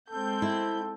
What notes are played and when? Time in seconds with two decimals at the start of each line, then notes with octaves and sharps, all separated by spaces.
0.10 G#3 C4 A4 G6
0.42 E4